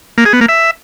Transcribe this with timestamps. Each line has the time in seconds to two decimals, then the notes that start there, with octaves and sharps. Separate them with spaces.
0.18 A#3
0.25 G#4
0.33 B3
0.41 A#3
0.49 E5